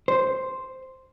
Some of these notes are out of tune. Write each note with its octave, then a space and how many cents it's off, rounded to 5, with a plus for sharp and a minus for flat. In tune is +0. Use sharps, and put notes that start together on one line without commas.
C5 +0